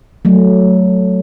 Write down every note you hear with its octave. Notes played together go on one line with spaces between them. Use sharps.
F#3 A3